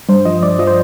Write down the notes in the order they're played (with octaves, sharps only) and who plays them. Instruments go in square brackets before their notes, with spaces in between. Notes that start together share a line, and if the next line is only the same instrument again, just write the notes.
[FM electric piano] G2 C5
F3 D#5
G2 D5
F3 D#5
C5